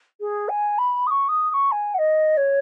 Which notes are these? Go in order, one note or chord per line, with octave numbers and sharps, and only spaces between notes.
G#4
G#5
B5
D#6
C#6
D#6
D#6
C#6
G#5
F#5
D#5
C#5